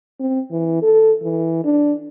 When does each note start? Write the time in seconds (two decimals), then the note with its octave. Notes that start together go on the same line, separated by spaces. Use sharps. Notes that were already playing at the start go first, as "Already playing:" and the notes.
0.20 C4
0.51 E3
0.82 A4
1.23 E3
1.64 D4